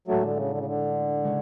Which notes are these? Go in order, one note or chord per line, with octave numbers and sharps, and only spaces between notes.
A2 F#3 G#3 A3 D4
D3
C#3
D3
C#3
D3
C#3 G#3 C#4